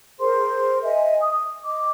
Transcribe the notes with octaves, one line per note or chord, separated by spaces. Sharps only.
G#4 A#4 C5 C6
D#5 E5 G#5
D#6
D#5 D6